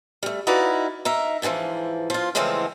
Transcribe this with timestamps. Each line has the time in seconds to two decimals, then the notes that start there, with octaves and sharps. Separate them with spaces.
0.23 G3 A3
0.47 D#4 E4 F#4 B4 D5 F5
1.05 D#4 A#4 E5
1.42 G#2 B2 D3 E3 F3
2.10 F3 F4
2.35 C#3 E3 F3 G#3 A3 C4